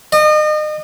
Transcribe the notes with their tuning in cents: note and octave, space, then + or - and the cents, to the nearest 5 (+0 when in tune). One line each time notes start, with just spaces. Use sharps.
D#5 -35